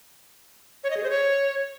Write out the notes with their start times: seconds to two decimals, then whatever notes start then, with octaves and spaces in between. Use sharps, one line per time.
0.84 C#5
0.90 D#5
0.97 G#4
1.03 C5
1.10 C#5